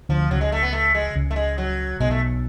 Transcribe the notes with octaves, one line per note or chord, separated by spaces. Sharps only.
D2 D3 F3
C#2 C#3 F#3
G#3
A3
B3
A3
G#3
C#2 C#3
A3
G#3
F#3
B1 B2 G#3
A3